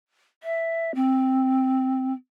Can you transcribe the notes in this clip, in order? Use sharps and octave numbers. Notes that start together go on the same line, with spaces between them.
E5
C4